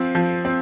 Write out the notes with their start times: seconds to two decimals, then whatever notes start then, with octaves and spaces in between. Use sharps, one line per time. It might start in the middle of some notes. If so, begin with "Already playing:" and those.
Already playing: F3 C4
0.15 F3
0.45 C4